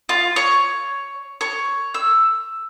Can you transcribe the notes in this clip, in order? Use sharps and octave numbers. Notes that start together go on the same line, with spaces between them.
F4
C#5
C#5
E6